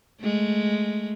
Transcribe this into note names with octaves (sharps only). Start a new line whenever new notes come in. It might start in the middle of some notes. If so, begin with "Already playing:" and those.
G#3 A3